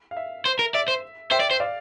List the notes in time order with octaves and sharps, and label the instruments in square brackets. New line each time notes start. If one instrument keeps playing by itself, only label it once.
[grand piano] F5
E5
[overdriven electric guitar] C5
A#4
[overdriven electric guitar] D5 [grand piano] E5
[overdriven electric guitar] C5
[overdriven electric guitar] C5 [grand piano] E5 G5
[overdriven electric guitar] D5
C5
[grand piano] D5 F5